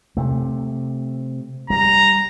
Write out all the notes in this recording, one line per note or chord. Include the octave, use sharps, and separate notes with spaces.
C3 A3
G3 A#5